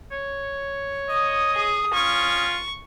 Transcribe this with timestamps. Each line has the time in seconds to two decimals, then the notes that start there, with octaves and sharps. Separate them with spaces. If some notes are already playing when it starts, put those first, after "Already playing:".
0.12 C#5
1.10 D#5 D#6
1.55 G#4
1.93 C#4 F4 C#6